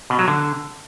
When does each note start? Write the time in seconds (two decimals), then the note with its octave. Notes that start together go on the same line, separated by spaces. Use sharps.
0.10 B2
0.19 F#3
0.28 D3